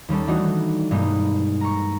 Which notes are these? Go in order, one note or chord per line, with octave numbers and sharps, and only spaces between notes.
D#2 G3 C#4 A4
E3 A3 D4 D#4 F#4
G2 B2 G#3 A#3 D#4
A#5 C#6